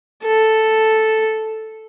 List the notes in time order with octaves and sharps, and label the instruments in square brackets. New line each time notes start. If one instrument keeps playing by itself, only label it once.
[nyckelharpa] A4